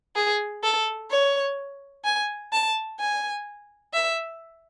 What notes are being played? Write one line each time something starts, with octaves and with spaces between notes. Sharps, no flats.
G#4
A4
C#5
G#5
A5
G#5
E5